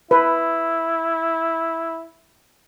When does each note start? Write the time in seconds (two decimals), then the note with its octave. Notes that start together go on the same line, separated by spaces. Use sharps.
0.11 E4 B4